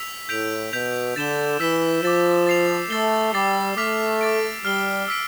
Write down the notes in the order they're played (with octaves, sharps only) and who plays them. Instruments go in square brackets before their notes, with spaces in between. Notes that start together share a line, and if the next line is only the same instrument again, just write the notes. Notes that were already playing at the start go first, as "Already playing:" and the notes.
Already playing: [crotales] E6 B6 F7
[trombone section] A2 [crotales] G6 B6 D7 F7
[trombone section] B2 [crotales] G6 B6 F7
[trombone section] D3 [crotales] A6 E7 G7
[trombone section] E3 [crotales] E6 B6 E7 G7
[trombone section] F3 [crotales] D6 A6 E7
[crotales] A6 C7 F7
[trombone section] A3 [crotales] E6 A6 C7 G7
[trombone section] G3 [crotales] D6 A6 C7
[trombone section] A3 [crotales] D6 F6 B6 F7
[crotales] D6 A6 D7
[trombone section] G3 [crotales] F6 C7 G7
[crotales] E6 B6 D7